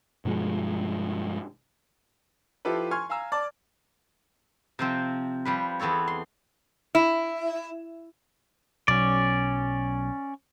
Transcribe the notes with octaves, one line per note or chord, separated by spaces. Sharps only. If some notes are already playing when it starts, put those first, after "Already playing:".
G2 B2 F3 G#3
F3 E4 F4 G4 A4 B4
G#5 C6 C#6 F6 G#6
F5 G#5 A#5 E6
D5 A5 D6
C3 F3 C4
F3 G3 B4
E2 B3 C4 A4 C#5
C6
E4
B1 F#3 C#4 D5